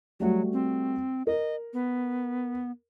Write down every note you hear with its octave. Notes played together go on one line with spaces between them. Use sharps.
F#3 G3 A3 F#4
C4
A#4 D#5
B3